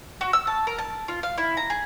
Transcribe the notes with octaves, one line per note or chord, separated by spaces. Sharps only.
F#4
E6
A5
A#4
A5
F4
F5
E4
A#5
G#4